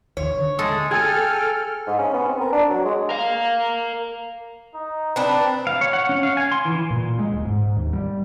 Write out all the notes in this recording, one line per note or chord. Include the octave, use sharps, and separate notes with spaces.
D#2 D#3 C#5
D3
G#3 A4
G#4 A4 G5 F6 G#6 A6 D#7
G#2
C#4
B3
C4
A#4
D4
F#3
G#3
A#4 F5
D#4
C4 D4 B4
F5
C#5
F#5
C#4
F5
G#5
C6
E3
A#2
G#3
D1
G#2
D#2
G3